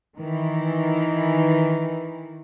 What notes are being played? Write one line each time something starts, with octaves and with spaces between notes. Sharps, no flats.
D#3 E3